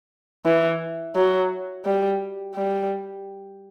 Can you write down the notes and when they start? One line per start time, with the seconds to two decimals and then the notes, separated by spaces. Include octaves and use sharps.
0.46 E3
1.16 F#3
1.85 G3
2.55 G3